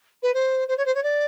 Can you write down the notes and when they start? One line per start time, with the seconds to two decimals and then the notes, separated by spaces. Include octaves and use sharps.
0.22 B4
0.34 C5
0.68 C5
0.77 C#5
0.85 C5
0.95 C#5
1.03 D5